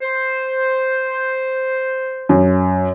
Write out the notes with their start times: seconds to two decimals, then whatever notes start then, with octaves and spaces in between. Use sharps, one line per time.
0.01 C5
2.29 F#2